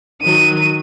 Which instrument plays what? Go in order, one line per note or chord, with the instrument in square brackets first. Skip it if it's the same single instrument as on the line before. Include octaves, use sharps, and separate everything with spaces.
[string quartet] D#3 F#3 [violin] D#7